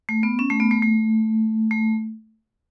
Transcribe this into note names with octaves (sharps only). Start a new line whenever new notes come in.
A3
B3
C#4
A3
B3
A3
A3
A3